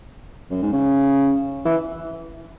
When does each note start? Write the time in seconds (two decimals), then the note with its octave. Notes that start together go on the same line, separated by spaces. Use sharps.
0.51 F#2
0.62 G#2
0.72 C#3
1.65 E3